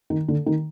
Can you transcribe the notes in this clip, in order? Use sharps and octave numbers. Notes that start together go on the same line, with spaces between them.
D#3
D3
D#3